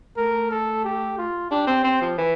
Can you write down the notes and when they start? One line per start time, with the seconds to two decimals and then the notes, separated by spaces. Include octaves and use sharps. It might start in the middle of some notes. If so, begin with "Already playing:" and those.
0.17 A3 A#4
0.51 A4
0.84 G4
1.18 F4
1.51 D4 G4
1.67 C4
1.84 C4
2.02 F3
2.18 E3